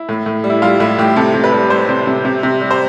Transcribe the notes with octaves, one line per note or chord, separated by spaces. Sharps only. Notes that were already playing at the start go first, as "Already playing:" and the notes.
Already playing: E4
A2
A2
G3
E4
G3 F4
A2 E4
A2 G4
C3 A4
C3
B4
G3
G3 C5
C3
C3
C3
C3
G3
C5